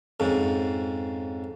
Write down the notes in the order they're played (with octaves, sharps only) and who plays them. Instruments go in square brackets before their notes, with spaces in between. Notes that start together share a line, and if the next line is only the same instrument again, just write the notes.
[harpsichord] F2 G#2 C#3